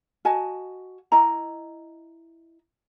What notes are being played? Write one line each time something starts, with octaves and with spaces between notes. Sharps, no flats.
F#4 D#5 G#5 A5
E4 D#5 A#5